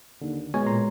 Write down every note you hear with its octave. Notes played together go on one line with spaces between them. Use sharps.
D#2 D3
B2 G#3 C#5 G#5
A#2 A#5 C6